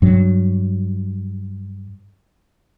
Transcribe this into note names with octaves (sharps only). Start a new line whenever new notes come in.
G2 F#3